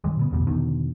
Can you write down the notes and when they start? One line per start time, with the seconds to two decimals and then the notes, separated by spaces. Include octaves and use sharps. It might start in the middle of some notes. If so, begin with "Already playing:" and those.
0.04 G2 D#3 G3 G#3
0.17 A#2 D3 B3
0.31 A1 E2 B2 G3
0.47 E2 B2 D3 D#3